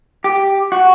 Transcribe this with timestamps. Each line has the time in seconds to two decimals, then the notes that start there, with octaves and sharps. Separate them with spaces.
0.24 G4
0.72 F#4